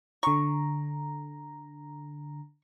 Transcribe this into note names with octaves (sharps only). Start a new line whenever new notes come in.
D3 A#5 C#6